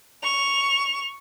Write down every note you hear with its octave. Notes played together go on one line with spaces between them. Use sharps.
C#6 F7